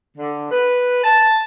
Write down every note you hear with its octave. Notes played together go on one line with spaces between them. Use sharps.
D3
B4
A5